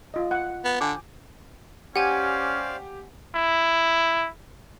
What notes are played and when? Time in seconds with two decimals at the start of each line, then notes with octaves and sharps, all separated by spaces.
0.14 F4 D#5
0.31 F#5
0.65 B3
0.81 D3 G5 G#5 D6
1.96 C#4 G4 C5 D5 F5 F#5 G#5 G#6
3.35 E4